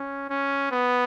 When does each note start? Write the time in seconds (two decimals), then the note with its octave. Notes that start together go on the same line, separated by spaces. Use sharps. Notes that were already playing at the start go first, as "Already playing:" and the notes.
Already playing: C#4
0.30 C#4
0.72 B3